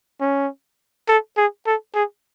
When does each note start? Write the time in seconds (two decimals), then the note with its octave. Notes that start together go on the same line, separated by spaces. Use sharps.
0.21 C#4
1.08 A4
1.37 G#4
1.66 A4
1.94 G#4